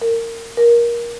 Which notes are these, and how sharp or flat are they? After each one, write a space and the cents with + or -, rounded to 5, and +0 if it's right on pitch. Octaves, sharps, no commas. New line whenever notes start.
A#4 -20
A#4 +20